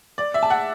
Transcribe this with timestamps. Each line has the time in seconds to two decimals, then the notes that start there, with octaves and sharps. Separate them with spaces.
0.18 D5
0.34 E5
0.43 A5
0.50 F#5